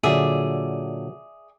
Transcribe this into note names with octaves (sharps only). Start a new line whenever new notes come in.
A#2 D3 F#3 G#4 D5 E5